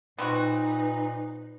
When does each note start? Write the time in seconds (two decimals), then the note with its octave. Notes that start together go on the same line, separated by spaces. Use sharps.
0.19 A#2 B3 C4 D#4 F#4 B4